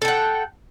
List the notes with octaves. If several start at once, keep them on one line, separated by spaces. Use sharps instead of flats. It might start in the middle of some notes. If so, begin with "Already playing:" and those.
A4 F#5 G5